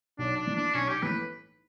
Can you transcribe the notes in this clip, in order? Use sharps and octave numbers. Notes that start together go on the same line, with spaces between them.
B1 D4
D4
A2 E3
D4
B1 C#4
G4
A2 E3 B4